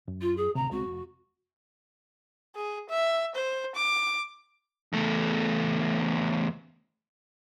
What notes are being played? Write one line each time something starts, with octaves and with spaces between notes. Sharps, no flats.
F#2
F4
G#4
D2 A2 C3 A#5
C#2 G#3 C4 F#4
F1
G#4
E5
C5
D6
E2 A3